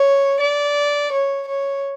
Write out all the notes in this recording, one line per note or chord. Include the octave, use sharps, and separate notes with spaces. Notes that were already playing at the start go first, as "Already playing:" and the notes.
Already playing: C#5
D5
C#5
C#5